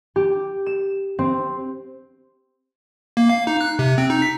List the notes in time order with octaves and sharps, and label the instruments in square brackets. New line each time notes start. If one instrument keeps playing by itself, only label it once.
[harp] G4
E7
C4
[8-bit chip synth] A#3
F5
D#4
F#6
C3
C4
D#4
B6